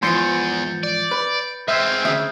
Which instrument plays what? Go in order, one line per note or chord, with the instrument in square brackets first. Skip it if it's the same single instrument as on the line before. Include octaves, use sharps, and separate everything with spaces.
[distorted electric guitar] E2 [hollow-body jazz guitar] G#2 E3 F3 [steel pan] C6 [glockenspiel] G6 A6 C#7
[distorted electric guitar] D5
[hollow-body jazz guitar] B4
[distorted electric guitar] G#3 C4 [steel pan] E5 [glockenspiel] F6 G6 G#6
[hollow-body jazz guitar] D2 C#3 [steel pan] E5 [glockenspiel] D#6